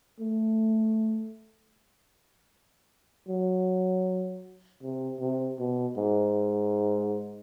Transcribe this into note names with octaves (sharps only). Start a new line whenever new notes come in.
A3
F#3
C3
C3
B2
G#2